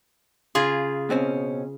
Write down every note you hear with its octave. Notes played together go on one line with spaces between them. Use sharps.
C#3 F4 G#4
B2 C4 C#4